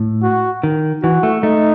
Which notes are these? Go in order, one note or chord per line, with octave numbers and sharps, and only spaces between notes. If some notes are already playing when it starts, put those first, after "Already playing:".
Already playing: A2
F#4
D#3
E3 F#4
A3
A3 D#4